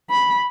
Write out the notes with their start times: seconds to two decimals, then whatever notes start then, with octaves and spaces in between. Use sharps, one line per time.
0.10 B5